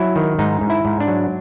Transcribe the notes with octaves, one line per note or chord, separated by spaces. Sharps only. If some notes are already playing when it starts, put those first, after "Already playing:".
Already playing: F#3 E4
D#3
G#2 D#4
G#2
E4
G#2
D4
F#3